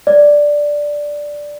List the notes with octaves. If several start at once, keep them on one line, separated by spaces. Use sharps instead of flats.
D5